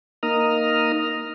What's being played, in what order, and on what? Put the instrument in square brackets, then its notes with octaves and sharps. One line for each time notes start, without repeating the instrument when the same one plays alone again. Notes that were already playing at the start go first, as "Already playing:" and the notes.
[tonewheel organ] A#3 D#4 A#5 D#6 F6